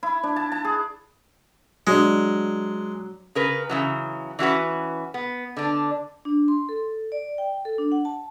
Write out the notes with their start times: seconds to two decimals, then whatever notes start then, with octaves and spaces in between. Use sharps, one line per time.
0.03 E4
0.23 D4
0.36 A5
0.52 A5
0.64 G#4
1.87 F#3 G#3 D4
3.35 C#3 A#4 B4
3.69 C#3 E3 F#3
4.39 E3 C#4 F#4 B4
5.14 B3
5.57 D3 D4
6.25 D4
6.48 C6
6.69 A4
7.12 D5
7.38 G5
7.65 A4
7.78 D4
7.92 F#5
8.05 A5